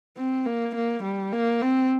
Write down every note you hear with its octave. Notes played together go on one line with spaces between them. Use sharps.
C4
A#3
A#3
G3
A#3
C4